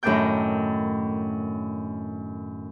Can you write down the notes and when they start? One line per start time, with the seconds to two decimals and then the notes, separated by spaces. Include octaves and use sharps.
0.03 F#2 A2 D#3 D4 G5 G6